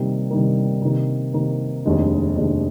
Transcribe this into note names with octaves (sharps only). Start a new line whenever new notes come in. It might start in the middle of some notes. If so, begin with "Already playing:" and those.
Already playing: C3 D#3 G3 A#3
C3 D#3 G3 A#3
C3 D#3 A#3
C3 D#3 A#3
F1 D#2 D#3 G#3 D4
F1 D#2 D#3 G#3 D4